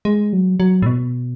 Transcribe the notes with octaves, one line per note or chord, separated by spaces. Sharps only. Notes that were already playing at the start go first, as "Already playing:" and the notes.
G#3
F#3
F#3
A2
B2